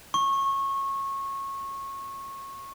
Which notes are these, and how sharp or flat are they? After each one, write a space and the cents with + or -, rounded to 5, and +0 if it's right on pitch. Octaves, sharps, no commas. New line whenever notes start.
C#6 -20